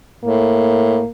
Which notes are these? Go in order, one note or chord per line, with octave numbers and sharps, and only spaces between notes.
A2 A#3